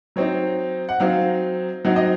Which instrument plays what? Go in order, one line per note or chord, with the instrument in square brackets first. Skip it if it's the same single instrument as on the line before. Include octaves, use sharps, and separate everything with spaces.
[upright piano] F#3 C4 D#4 C#5
F#5
F#3 C4 D#4 F5
F#3 C4 D#4 F#5
D#5